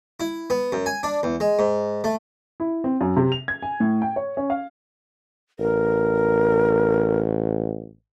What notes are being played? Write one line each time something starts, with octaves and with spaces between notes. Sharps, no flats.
E4
B3
F#2
G#5
D4
E2
G#3
G#2
A3
E4
C4
F#2
C3
F7
G#6
G#5
A2
G5
C#5
C#4
F5
A1 A#4